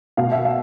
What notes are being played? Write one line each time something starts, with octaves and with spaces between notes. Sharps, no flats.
B2 F5
E5
F5